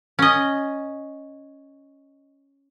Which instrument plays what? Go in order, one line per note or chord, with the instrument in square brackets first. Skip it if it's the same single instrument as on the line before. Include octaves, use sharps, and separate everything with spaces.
[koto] C#4 D#5